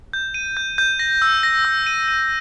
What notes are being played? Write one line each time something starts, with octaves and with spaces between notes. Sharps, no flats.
G6
D#7
G6
G6
A#6
E6
A#6
E6
D#7
D#7